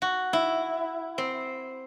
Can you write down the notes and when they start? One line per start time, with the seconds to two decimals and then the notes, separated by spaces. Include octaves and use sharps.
0.02 F#4
0.33 E4
1.18 C4